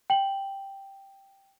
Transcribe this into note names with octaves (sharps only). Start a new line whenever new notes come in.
G5 F#7